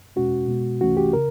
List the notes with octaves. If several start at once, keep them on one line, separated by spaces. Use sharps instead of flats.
E2 B2 G#3 C#4 F#4
B2 G#3 B3
C2 C3 E3 A3 C#4 F#4
G4
C#3 A#4